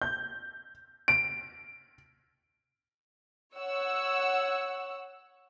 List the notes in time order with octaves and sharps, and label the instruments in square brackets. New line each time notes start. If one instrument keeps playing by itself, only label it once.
[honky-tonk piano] G6
D7
[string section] C#5 F#5 E6